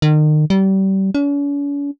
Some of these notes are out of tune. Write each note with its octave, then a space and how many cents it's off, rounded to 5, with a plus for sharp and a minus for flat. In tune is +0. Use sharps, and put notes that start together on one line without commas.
D#3 -35
G3 -30
C#4 +45